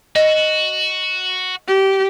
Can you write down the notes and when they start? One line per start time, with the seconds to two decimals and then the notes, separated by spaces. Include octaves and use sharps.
0.16 F#4 D#5
1.68 G4